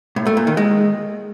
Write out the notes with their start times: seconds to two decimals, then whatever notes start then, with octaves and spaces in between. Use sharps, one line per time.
0.16 A2
0.27 A3
0.37 A#2
0.47 D#3
0.57 G#3